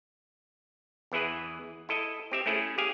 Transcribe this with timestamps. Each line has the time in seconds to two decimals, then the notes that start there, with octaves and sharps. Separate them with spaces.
1.12 E2 E3 E4 G#4 B4
1.89 E4 A4 D#5
2.32 C4 G4 E5
2.46 A3 C#4 E4 G#4
2.78 G4 G#4 F5 G#5